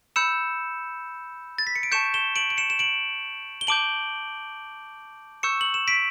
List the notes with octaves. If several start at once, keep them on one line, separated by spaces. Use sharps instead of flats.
B5 E6 G6 C#7 E7
A6
B6
C#7
D7
A5 C#6 G6 C#7 E7
E7 G7
D7 F#7
D7
C#7 E7
E7
D7 F#7
G7
A5 D6 G6 D7 F#7
C#6 E6 G6 C#7 E7
F#7
E7
B6 D7